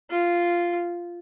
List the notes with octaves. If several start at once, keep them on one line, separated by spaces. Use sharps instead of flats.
F4